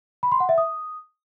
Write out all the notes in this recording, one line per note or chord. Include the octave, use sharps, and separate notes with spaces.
B5
C6
F#5
E5
D#6